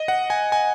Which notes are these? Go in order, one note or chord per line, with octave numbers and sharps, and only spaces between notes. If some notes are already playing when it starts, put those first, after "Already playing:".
Already playing: D#5
F#5
G#5
G#5